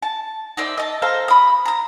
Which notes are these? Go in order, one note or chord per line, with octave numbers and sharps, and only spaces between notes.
A5
D#4 C5 D5 E5
D#5 A5
A4 C5 F5 A#5
B5 D#6
A#5 D#6